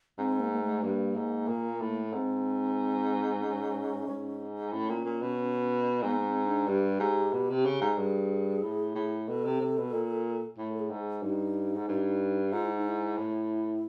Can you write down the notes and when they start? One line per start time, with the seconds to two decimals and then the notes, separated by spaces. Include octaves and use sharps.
0.18 G#2 C4
0.40 A#3
0.51 A#3
0.61 A3
0.83 G2 A#3
1.16 G#2
1.48 A#2
1.80 A2
2.13 G#2 C4
3.39 C4
3.43 C#4
4.08 G#2
4.72 A2 C#4
4.89 A#2
5.05 A#2
5.22 B2
6.02 G#2 B3
6.20 B3
6.25 C4
6.46 D4
6.68 G2 G4
7.00 G#2
7.33 B2
7.50 C3
7.66 C#3
7.81 G#2
7.98 G2 G#4
8.63 A2
8.95 A2
9.28 B2 A4
9.45 C3
9.61 C3
9.77 B2
9.93 A#2
10.58 A2 A4
10.73 A4
10.79 G#4
10.90 G#2
11.22 G2 D#4
11.76 G#2
11.88 G2
12.52 G#2 F4
12.65 E4
12.77 D#4
12.88 E4
13.17 A2